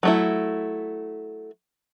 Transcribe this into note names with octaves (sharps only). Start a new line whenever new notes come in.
F#3 A3 E4